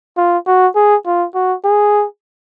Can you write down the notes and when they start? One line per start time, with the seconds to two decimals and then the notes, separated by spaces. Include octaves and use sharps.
0.17 F4
0.47 F#4
0.75 G#4
1.06 F4
1.34 F#4
1.64 G#4